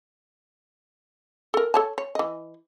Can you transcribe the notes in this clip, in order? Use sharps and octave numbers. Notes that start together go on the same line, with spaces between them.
A4 A#4
A4 C#5 A5
C#5
E3 D#5